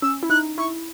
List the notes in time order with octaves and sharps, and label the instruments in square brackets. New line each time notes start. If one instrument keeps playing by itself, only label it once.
[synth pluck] C#4 [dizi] E6
[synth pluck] E4
[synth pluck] D#4 [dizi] F#6
[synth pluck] E4 [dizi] C#6